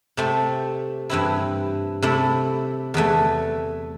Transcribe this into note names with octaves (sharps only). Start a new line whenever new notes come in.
C3 A3 C4
G2 E3 C4 E4
C3 A3 E4
E2 E3 A3